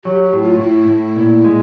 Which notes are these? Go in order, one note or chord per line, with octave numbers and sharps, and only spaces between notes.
F#3 G4
G4
A2 E4
F4
A2 E4
A2
A#2
G#3